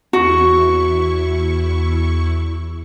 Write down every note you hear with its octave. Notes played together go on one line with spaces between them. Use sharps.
E2 E4 F#4 C#6